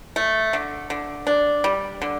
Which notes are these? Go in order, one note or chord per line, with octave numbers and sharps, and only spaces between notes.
A3
D3
D3
D4
G3
D3